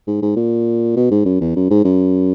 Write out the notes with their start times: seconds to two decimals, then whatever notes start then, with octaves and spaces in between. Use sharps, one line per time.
0.07 G#2
0.22 G#2
0.36 A#2
0.96 B2
1.11 G#2
1.25 F#2
1.41 E2
1.56 F#2
1.70 G#2
1.85 F#2